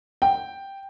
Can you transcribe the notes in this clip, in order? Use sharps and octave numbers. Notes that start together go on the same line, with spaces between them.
G5